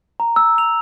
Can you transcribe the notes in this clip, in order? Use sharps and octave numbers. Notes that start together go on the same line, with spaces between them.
A#5
E6
F7